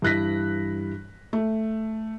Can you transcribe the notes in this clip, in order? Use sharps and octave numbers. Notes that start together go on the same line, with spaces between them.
G2 E3 F#6 A#6 B6
A3